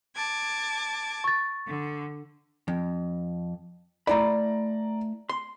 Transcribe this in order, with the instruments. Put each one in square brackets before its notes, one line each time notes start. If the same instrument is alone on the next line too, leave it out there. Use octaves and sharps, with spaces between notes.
[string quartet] A5 D6 G#6
[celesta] C#6 A6
[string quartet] D3
[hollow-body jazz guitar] F2
[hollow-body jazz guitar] A3 E4 B5 [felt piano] D5 A#5
[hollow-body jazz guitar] C6